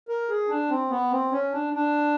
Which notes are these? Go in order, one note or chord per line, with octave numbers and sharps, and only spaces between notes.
A#4
G#4
D4
C4
B3
C4
C#4
D4
D4